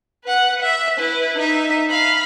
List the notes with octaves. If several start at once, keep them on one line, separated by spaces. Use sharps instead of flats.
B4 F#5
E5
E4 B4
D#4 E5
F5 B5